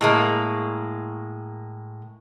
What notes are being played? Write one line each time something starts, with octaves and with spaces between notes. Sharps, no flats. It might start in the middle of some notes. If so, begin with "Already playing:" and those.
A2 G#3 A#3